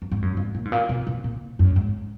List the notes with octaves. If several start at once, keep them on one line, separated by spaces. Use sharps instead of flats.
F#2
G#2
F#2
G#2
A#2
G#2
A#2
B2
B2
A#2
F#2
G#2